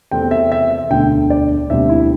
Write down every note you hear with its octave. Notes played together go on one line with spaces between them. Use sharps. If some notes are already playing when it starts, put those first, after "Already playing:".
E2 C3 A3 C4 G5
E5
E5
E5
E1 D2 D3 G5
D5
E1 D2 C3 G3 C4 E5
E4